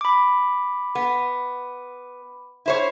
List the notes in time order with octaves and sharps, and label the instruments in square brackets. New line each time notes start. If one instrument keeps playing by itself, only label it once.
[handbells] B5 D6
[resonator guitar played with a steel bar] B3
E4 C5 C#5